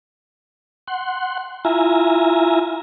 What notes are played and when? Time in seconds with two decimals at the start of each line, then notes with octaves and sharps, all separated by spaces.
0.88 F#5 C6
1.65 E4 F4 E5 G#5 A#5